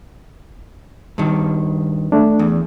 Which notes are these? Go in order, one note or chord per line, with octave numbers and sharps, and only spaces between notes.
G2 D#3
A3 D4
E2